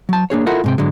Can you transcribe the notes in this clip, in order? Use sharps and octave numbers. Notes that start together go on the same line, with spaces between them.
F#3 A5
A#3 D4 G#4 C#5
E4 F4 A4 A#4 F#5
G#2 C3 G5
G#2 D3 F#3 G#3